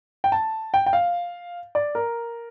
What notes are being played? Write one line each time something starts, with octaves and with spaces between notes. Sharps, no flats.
G5
A5
G5
G5
F5
D5
A#4